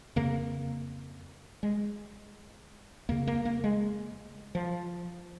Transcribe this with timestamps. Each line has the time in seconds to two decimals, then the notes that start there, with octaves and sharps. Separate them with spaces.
0.16 F2 C#3 A#3
1.63 G#3
3.09 F2 C#3 A#3
3.27 A#3
3.45 A#3
3.64 G#3
4.55 F3